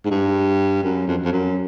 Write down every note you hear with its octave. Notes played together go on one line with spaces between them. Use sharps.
G#2
G2
F#2
F2
F2
F#2